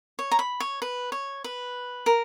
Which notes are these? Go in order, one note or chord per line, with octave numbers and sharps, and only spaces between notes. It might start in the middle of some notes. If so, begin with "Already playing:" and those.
C#5
A#5
B5
C#5
B4
C#5
B4
A#4